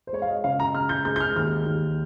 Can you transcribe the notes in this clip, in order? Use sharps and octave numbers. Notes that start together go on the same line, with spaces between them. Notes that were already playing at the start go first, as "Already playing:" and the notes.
C5
G#3 C#5
F5
D#5
C#3 F5
A#5
G#3 F6
G6
G#3 G6
G6
F6
D#2 F6
D#2